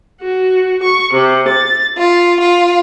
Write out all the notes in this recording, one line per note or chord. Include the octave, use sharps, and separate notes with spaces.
F#4
C#6
C3
A6
F4
F4